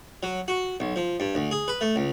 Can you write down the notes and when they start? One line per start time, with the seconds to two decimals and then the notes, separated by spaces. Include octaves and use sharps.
0.23 F#3
0.48 F#4
0.80 B1
0.96 F3
1.20 G2
1.35 D2
1.51 G#4
1.68 B4
1.81 A3
1.96 C#2